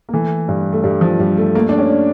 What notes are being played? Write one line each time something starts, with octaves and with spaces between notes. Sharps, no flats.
A#3
E3 A3
G2
A3
G2 G3
F3
G2 G3
A3
A3 A#3
D4
C#4
D4